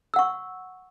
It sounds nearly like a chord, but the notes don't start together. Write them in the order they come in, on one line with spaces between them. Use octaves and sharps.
E6 F#5 C#6